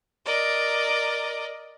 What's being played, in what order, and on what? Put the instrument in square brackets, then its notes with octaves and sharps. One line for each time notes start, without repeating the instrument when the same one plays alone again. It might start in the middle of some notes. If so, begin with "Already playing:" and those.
[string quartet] A#4 D5 D#5